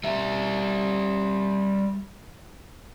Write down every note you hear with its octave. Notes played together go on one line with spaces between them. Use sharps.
G3 E5